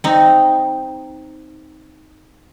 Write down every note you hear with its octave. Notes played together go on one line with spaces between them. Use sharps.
C4 D#4